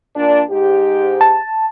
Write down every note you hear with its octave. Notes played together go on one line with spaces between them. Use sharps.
A#2 D4
G#2 G4
A5